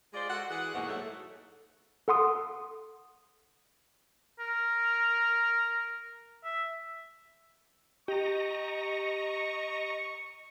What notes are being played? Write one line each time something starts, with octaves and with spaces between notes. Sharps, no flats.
G#3 F4 C5 D5
F#4 A4 F#5
E3 G#4 F#5
E2 G#2 B2 A#3 F#4
G#2 F#3 A3
A4 F#5 C6 D#6
A#4
E5
G4 D#5 A#5 C#6